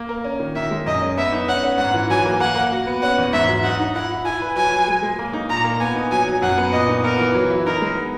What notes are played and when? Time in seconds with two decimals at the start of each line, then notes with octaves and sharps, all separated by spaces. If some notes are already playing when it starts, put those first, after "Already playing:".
Already playing: A#3
0.09 A#4
0.24 C#4
0.39 D#3
0.55 D#3 E5
0.71 G#3
0.86 F#2 D#5
1.01 C#4
1.17 B3 E5
1.32 D#4
1.48 C#4 F#5
1.64 C#4
1.78 G#2 F#5
1.94 E3
2.09 F#3 G#5
2.26 A#3
2.40 A#3 F#5
2.56 A#3
2.72 F#4
2.87 B3
3.02 C#4 F#5
3.18 E2
3.33 G#2 E5
3.49 F#3
3.64 D#4 F#5
3.80 D#4
3.95 E4 F#5
4.11 E4
4.25 E4 G#5
4.41 B4
4.56 F#3 G#5
4.72 F#3
4.88 G#3
5.03 G#3
5.19 A#3
5.33 D#4
5.49 A#2 A#5
5.64 A#3
5.80 B3 G#5
5.95 D#4
6.11 F#3 G#5
6.27 F#3
6.42 F#2 F#5
6.58 B3
6.73 A#2 D#5
6.88 D#4
7.04 B3 A#4
7.19 E3
7.34 F#3
7.50 E4
7.66 D#4 A#4
7.81 G#3
7.96 B3